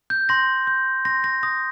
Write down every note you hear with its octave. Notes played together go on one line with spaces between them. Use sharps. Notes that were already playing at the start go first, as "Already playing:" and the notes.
G6
C6 A#6
G6
C6 A#6
A#6
D#6 G6 A#6